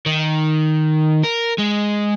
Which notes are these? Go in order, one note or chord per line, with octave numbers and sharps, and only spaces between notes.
D#3
A#4
G#3